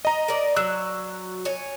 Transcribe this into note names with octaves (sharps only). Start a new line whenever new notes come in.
D#5 A#5
A#4 D5
F#3 E6 F#6
C#5 G#5